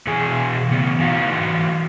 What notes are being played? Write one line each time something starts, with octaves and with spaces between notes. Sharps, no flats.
B2 E3 G#4 G#5
C#3 E3 B3
E3 D#4 F#4 F5 A#5